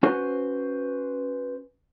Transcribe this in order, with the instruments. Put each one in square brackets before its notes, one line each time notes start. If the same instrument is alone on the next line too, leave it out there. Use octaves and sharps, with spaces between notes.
[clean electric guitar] C#4 F#4 B4 C5